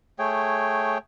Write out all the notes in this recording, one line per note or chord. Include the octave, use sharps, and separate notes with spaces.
A3 G#4 C#5 G5